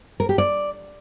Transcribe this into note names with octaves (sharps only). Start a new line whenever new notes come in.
A#4
G4
D5